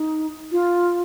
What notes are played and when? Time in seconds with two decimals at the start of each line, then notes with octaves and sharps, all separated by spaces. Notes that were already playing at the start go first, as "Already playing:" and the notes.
Already playing: D#4
0.52 F4